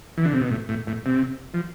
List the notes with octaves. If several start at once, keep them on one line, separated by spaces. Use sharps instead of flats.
E3
D3
C3
B2
A2
A2
A2
C3
F3